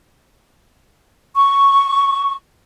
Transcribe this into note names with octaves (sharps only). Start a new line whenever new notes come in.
C#6